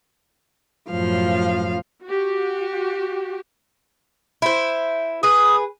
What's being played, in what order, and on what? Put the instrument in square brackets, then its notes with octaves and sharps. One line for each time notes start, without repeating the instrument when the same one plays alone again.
[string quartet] F#2 A2 F3 F5
[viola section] F#4 G4
[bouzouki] E4 C5
[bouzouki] G#4 B4 [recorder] D#6